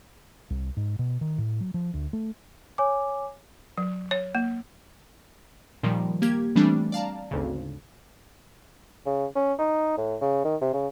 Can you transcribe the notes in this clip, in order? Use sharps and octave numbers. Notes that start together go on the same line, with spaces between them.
C2
G#2
B2
D#3
A2
F#3
F3
D2
A3
C#5 G#5 D6
F#3
C#5
A#3
A#2 D#3 F3 G3
A#3 G4 G#6
E3 G3 A3 C4 D4
D5 F5 A5 A#5
G#1 D2 C#3
C#3
C#4
D#4
A2
C#3
D#3
C3
C#3